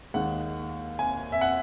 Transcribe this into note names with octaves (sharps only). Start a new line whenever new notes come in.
D#2 D#3 G#3 F#5
G#5
E5
F#5